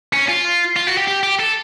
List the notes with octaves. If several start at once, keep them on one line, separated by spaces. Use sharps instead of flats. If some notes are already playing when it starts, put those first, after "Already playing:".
C#4
F4
F4
F#4
G4
G4
G4
A4